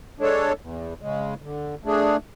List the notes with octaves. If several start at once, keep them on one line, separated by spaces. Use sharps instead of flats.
G#3 D4 A4 C#5
E2
C#3 G#3
D3
A3 D4 G#4